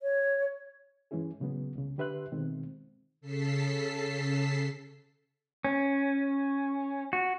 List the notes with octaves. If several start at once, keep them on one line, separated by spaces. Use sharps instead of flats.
C#5
G2 E3 G#3 C#4 E4 G#4
A#2 C#3 F#3 G#3 B3
C2 C#3
D3 G4 B4 E5 C6 F#6
B2 D#3 G#3 C4
C#3 A4 A5 B6 C7
C#4
F#4